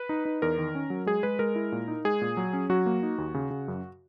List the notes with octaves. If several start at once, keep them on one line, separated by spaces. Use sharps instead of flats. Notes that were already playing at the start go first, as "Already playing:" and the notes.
Already playing: B4
D#4
D#4
E2 A#4
D#3
C#4
F#3
G#3 G#4
G#3 B4
G#3 A#4
E4
A#2
D#4
G#3 G#4
A#2
F#3
C#4
F#3 F#4
A#3
D#4
D#2
C#3
C#3
F#2